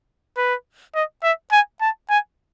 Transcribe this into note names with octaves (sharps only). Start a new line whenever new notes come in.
B4
D#5
E5
G#5
A5
G#5